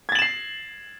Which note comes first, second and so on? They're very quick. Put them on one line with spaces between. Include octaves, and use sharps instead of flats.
G#6 A6 F#7 E7 C7